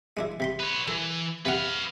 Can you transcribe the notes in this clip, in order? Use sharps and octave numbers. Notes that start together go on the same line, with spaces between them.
G#3 D4 E4
C3 B5 C6
B4 C#5
E3 A4
C3 C#4 B4 F5 F#5